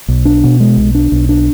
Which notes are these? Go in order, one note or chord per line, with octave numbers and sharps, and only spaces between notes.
B1
D4
B2
G#3
B1
D4
B1
D4